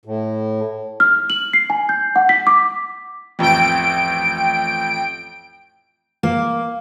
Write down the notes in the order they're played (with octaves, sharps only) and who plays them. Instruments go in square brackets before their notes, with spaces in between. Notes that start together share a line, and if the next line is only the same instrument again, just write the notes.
[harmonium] A2
[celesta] F6
F#7
C7
G#5
G6
F#5
B6
D6
[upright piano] A1 F2 [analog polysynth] G5 D7
[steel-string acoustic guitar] A#3